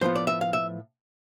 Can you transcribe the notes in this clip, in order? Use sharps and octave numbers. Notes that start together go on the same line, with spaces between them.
A2 F3 B3 F4 C5
D5
E5
F5
E5